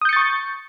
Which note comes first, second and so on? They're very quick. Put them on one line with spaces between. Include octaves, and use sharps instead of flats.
D#6 G6 C#7 A6 C#6